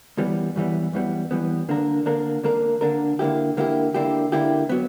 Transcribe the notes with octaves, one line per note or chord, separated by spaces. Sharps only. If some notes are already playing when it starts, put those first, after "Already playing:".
F#2 E3 G3 B3
F#2 E3 G3 B3
F#2 E3 G3 B3
F#2 E3 G3 B3
D3 A#3 D4 A#4
D3 A#3 D4 A#4
D3 A#3 D4 A#4
D3 A#3 D4 A#4
D3 A#3 E4 G4
D3 A#3 E4 G4
D3 A#3 E4 G4
D3 A#3 E4 G4
F#3 B3